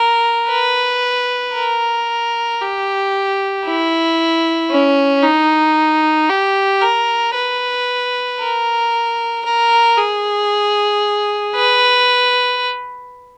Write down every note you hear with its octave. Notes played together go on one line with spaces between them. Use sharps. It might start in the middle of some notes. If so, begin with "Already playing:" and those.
Already playing: A#4
B4
A#4
G4
E4
C#4
D#4
G4
A#4
B4
A#4
A#4
G#4
B4